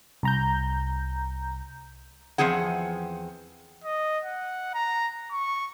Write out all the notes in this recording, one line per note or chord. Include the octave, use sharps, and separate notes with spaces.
C2 A#5 G6
E2 F3 C4 G#4 F#5
D#5
F#5
A#5
C#6